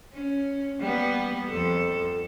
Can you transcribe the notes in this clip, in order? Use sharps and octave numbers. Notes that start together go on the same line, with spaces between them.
C#4
G3 A#3 B3
F2 A4